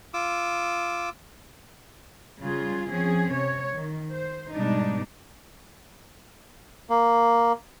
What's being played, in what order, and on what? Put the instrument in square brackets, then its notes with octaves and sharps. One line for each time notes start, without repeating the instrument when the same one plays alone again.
[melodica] F4 D6 E6
[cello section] C#3 G3 F4 G#4
F3 C4 C#4 G#4
C3 C#5
D#3
C5
G#2 B2 G3 G#3 D4 D#4
[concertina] A#3